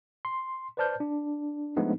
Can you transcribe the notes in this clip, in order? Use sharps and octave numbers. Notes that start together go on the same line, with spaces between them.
C6
B4 C5 D5 A5 F6 G6
D4
F3 G#3 A3 B3 D4 D#4